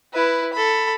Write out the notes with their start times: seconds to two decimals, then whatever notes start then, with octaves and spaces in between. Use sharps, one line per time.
0.14 E4 B4
0.53 A4 B5